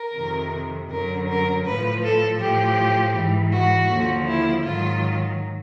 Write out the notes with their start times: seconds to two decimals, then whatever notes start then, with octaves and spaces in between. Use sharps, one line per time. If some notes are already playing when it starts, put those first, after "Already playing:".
Already playing: A#4
0.14 F2 C3 D#3
0.89 F#2 D3 F#3 A#4
1.27 A#4
1.64 A2 F3 B4
2.02 A4
2.39 A2 F3 G4
3.13 G#2 E3
3.51 F#4
3.88 D#2 D3 F3
4.26 E4
4.63 G#2 D#3 F#3 F4